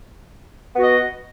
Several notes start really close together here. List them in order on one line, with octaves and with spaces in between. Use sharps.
B3 F#4 D#5